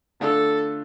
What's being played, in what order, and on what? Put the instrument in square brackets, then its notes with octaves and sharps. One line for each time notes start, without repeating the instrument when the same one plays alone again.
[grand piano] D3 A3 D4 F4 [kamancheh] A4